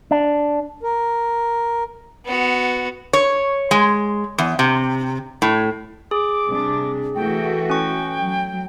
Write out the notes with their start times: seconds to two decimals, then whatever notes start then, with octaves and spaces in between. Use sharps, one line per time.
0.11 D4
0.82 A#4
2.25 B3 F#4
3.13 C#5
3.71 G#3
4.38 E2
4.59 C3
5.42 A2
6.11 G#4 D6
6.47 C3 G3 D4
7.15 E3 A3 F#4 G5
7.70 C#4 G5 C#6
8.17 F#3